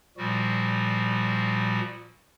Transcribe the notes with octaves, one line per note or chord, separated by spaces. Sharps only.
A#2 F3 G3 F#4